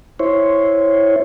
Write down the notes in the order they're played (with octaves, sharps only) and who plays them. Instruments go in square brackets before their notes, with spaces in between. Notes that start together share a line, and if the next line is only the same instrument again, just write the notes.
[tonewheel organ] E4 C5 C#5